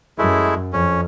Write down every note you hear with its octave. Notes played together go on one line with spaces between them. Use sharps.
F#2 G#3 A3 E4
F2 C#4